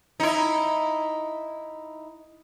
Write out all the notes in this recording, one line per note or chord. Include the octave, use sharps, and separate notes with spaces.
D#4 E4